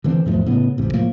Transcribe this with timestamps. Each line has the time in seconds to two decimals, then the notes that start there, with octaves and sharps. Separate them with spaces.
0.04 D3 E3 A#3 C4
0.26 E2 G#2 F3 A3
0.46 A2 C#3 B3
0.77 E1 A1 C3
0.93 A2 F3 A#3